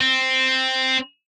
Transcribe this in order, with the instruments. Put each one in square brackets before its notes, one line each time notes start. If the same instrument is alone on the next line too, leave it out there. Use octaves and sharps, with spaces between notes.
[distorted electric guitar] C4